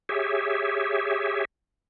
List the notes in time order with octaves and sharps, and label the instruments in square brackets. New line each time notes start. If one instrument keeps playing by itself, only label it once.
[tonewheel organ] G4 G#4 C#5 E5